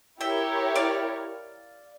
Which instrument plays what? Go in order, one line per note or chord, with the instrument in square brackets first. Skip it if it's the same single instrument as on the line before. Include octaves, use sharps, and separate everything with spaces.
[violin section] E4 G4 A#4 C#5 [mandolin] E5 G5
[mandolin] D5 F5